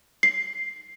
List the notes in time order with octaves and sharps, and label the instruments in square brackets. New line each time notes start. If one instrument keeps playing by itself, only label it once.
[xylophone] C7